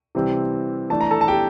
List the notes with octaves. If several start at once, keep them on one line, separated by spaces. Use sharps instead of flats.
C3 E3 G3 C4
E3 A3 D4 A5
A#5
A4 A5
A5
G4 G5